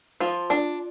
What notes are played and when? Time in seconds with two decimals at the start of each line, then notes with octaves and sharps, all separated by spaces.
0.20 F3 F4
0.50 D4